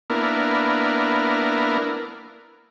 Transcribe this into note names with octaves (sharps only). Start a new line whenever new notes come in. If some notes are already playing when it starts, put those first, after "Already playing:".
A#3 B3 D4 E4 A#4